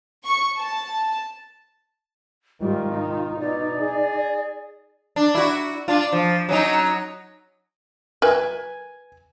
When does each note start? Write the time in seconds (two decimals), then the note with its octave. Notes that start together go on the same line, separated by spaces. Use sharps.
0.25 C#6
0.58 A5
2.61 G#2 D#3 G3 F4
2.94 D#4
3.40 B2 D5
3.80 G#4
5.16 D4
5.35 E4 F#4
5.88 D4 F4
6.13 F3
6.49 F#3 C#4 D#4
8.22 A#4 B4 E5 G#5